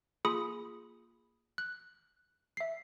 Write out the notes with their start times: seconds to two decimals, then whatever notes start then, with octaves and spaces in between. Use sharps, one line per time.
0.25 A#3 F4 G#4 B5 D#6 C#7
1.58 F#6
2.57 E5 C7